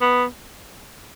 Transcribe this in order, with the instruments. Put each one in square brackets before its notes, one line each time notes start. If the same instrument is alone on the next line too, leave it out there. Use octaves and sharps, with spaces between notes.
[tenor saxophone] B3